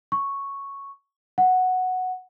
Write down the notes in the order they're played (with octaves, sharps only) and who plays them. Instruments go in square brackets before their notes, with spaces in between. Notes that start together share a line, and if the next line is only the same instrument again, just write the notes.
[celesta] C#6
F#5